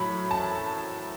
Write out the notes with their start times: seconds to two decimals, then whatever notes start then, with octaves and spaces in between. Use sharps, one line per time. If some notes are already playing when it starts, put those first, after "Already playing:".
Already playing: A2 F#3 A3 B5
0.31 A5